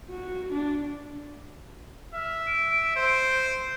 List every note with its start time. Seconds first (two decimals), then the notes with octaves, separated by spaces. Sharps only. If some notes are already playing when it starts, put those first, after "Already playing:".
0.10 F#4
0.52 D4
2.14 E5 F6
2.47 D7
2.97 C5